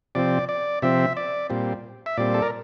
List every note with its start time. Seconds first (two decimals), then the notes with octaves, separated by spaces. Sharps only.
0.15 C3 F3 C4 D5
0.49 D5
0.82 C3 F3 C4 E5
1.17 D5
1.50 A#2 G3 C4
2.06 E5
2.17 A#2 G3 C4 D5
2.34 A4
2.42 A#4